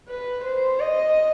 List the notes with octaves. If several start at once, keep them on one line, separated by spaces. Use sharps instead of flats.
B4
C5
D#5